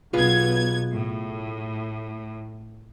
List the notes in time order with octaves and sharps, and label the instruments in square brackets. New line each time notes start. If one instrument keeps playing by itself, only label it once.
[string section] B1 B3 G#6 [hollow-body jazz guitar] F4 G#4 B4
[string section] A2